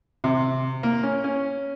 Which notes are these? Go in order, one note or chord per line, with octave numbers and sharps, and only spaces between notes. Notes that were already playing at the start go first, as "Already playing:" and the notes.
C3
A#3
C#4
C#4